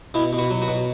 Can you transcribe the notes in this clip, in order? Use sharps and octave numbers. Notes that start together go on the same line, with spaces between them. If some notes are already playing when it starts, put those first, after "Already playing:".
B2 B3 E4
B2
F#4 B4
F#3
F#4 B4
B2